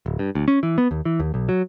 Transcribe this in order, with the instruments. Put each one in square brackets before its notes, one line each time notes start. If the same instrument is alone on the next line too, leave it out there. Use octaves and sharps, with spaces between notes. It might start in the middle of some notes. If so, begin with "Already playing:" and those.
[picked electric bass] D1
G2
D2
C#4
E3
B3
D#2
E3
D#2
B1
F#3